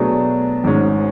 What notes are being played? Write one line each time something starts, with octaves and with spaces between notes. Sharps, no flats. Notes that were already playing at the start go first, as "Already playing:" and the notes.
Already playing: B2 F#3 A3 D4 G#4
G#1 G#2 G#3 C#4